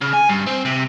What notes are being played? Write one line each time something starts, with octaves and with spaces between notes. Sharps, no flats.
C#3
G#5
G2
C4
C3